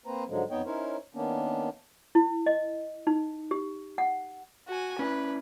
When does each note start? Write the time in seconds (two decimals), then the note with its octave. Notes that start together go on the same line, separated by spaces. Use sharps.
0.06 A#3 C4 B4 C5 A#5
0.28 G#2 D3 F3 F#3 G#3
0.50 F2 B3 D#4 C#5 D#5 G5
0.66 C#4 D#4 E4 A#4 C5 C#5
1.15 D#3 A#3 B3 C#4 D4
2.15 E4
2.46 D#5
3.07 D#4
3.51 G4
3.98 F#5
4.68 F#4 G#5
4.99 C#4 E4 B4 D5